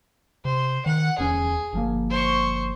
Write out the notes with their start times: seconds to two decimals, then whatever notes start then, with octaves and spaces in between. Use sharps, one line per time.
0.45 C3 C5
0.86 D#3 F#5
1.19 D1 E2 C#4 G#4
1.73 G1 F3 A#3
2.10 C5 C#6